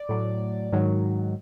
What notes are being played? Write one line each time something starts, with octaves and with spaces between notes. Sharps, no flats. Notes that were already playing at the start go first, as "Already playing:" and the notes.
Already playing: D5
A2 F#3
G#2 D#3 F#3